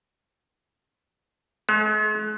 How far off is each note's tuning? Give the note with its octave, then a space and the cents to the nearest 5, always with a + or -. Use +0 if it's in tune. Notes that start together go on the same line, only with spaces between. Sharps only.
G#3 +45